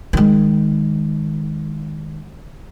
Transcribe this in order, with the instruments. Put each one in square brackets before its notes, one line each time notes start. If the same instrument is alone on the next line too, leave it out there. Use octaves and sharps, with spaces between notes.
[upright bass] D#3 G#3